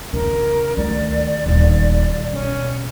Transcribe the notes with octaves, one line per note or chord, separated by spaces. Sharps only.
E2 C#3 A#4
D2 D#3 D5
D#1 D#2
B1 C#4